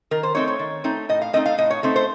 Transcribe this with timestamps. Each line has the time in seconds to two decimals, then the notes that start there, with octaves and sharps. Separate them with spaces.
0.11 D#3 A#4
0.23 C5
0.35 A3 C4 D#4 C#5
0.48 C#5
0.59 D#3
0.84 A3 C4 D#4
1.09 A2 D#5
1.21 F5
1.33 A3 C4 D#4 D#5
1.46 F5
1.58 A2 D#5
1.70 C#5
1.83 A3 C4 D#4
1.96 C5